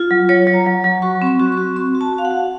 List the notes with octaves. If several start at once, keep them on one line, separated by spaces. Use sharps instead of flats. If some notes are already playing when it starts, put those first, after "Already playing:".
Already playing: F4
F#3
F#3 C#5
F#3
A#5
F#3
F#3
F#4 C#6
C4
C#6
F#4
C#6
F#4
C4 C6
F#4
A5
F#4
F5
F#5
F#4